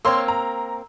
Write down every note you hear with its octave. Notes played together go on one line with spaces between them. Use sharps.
A#3 C4 C#5 C6 E6
A#5